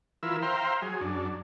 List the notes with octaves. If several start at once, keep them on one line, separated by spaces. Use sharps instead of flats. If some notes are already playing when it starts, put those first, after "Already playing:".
E3 E4 F4 A#4 E6
C5 E5 F5 G5 A#5 C6
F#3 G#4
F#2 D4